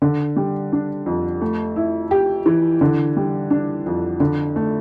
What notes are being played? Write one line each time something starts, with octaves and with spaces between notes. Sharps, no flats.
D3
G3
D4
F2
A3
E4
G4
E3
D3
G3
D4
F2
D3
A3